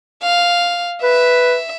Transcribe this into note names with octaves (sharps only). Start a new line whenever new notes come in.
F5
B4 E5